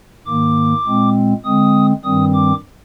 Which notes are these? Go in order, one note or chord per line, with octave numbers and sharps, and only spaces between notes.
G#2 D#3 A#3 D6
A#2 G#3 C4
D3 G#3 C4 D#6
G2 D#3 G3 C4 D#6
D6